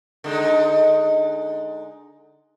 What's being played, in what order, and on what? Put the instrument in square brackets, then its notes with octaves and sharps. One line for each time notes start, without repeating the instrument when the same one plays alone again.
[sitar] D3 G#3 D#4